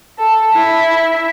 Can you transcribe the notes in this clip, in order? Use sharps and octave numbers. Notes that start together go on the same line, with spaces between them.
A4
E4